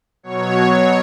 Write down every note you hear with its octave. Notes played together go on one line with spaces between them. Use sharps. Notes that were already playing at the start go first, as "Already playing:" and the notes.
B2 F#3 C#5